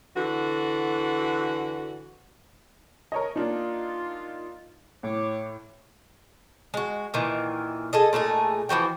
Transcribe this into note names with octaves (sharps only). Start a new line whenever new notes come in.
D3 E3 F#4
A#4 C#5 D#5
A#3 D4 D#4 F4
A2 C#5 D6
G#3 F#4
A#2 D#3 E3
G#4 A4 D#5
A#2 A3 D#4 G#4
E3 F3 F#4 G5